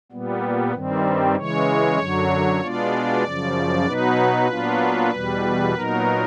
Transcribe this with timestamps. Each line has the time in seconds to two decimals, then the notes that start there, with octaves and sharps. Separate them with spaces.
0.12 A#2 G3 B3
0.73 G2 D#3 G3 C4
1.36 C#3 E3 G#3 C#5
1.98 F#2 D3 F#3
2.60 B2 G#3 B3 D4 F4 D5
3.24 F#2 C#3 F3
3.86 B2 F#3 B3 D#4 B4
4.48 A#2 F#3 B3 D4 F4
5.11 E2 B2 G3
5.73 A#2 F#3 B3 D#4 A#4